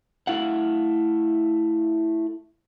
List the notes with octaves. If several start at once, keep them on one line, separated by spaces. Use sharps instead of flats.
A3 E4 F5 F#5